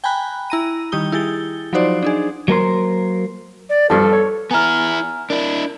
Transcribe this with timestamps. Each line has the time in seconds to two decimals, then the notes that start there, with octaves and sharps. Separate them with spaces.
0.04 G5 G#5 A#5 B5 F#6
0.50 E4 A#5 D#7
0.92 D#3 G3 G4 D#6 G7
1.12 E4 G4 G#4 A6 G7
1.73 F3 F#3 D#4 F#4 C5 D5
2.03 D4 D#4 G#4
2.48 F#3 A#3 A#4 C5
3.69 D5
3.90 G2 F3 A4
4.13 C#5
4.51 B3 E4 G#5 A#5 F6
5.30 D4 E4 A#4